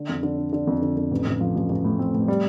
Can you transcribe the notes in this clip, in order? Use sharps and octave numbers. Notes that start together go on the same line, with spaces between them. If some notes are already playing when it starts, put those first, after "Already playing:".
Already playing: D3
F2
D3
D4
D3
F2
D3
F2
A1
A1
F3
A1
A1
A2
C4
A2
G3